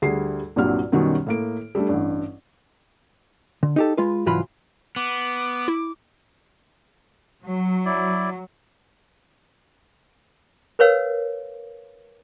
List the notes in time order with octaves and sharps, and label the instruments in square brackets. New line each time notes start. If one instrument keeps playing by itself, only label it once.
[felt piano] D2 G3 G#4 C7
C2 G2 A#2 F#3 G4 F6
F#2 B2 D#3 G3 C#4 F#4
A2 A#3 D7
G3 A3 D4
A1 G2
[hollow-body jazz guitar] D3
D#4 G4 A4
G#3 F4 B4
C2 G#2 E3 F#3 F4 B5
[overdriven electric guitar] B3 [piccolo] D6
[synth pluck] E4
[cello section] F#3
[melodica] E4 D5
[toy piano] A#4 B4 C#5 F5